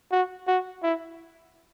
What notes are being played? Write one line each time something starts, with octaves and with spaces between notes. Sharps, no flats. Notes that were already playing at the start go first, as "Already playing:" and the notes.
F#4
F#4
E4